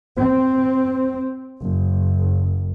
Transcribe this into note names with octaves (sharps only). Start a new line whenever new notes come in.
C4
F#1